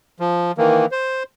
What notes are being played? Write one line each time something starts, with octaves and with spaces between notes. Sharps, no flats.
F3
D#3 E3 A#3
C5